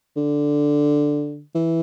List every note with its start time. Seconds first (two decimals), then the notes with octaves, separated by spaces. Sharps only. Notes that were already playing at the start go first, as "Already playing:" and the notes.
0.17 D3
1.55 E3